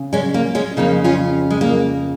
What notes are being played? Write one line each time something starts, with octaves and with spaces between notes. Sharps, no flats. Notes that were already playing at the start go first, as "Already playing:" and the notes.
Already playing: C#3
G#3 C#4
A#3
G#3 C#4
F2 C#3 A#3 D#4
C#4 F4
G#3
A#3